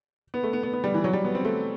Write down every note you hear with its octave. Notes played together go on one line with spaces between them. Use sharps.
B3
A3
B3
B3
B3
G3
E3
F#3
G3
B3
C4
A3